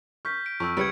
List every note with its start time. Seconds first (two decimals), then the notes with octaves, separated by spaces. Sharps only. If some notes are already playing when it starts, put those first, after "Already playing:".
0.25 C#6 F6 G6 B6
0.46 D7
0.60 F2 C#6 E6
0.77 C#2 G3 B4 G#6 C#7 D7